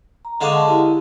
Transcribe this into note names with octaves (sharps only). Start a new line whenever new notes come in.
A#5
D3 G#3 F5 F#5 C#6 D6
A5
E4 G4